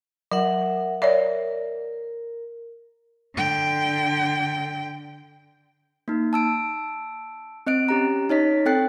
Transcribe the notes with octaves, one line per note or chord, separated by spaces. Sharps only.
F#3 A#4 E5 F#5
A#4 C#5 D5 E5
D3 G5
A#3 D#4
A5 E6 D7
C4 D#5 F#6 D7
C#4 G4 A#5
D#4 C#5 D#5 B6
C4 A4 G5 F#6 A6 C7